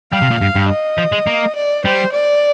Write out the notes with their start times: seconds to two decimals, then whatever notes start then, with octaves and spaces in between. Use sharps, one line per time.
0.12 G3 F5
0.22 C3
0.31 A#2
0.40 G2 F5
0.55 G2
0.69 D#5
0.98 F3
1.12 G#3
1.27 A#3
1.56 D5
1.85 G3 C5
2.13 D5